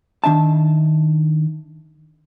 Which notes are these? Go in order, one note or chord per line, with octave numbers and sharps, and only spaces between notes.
D#3 D4 E5 A5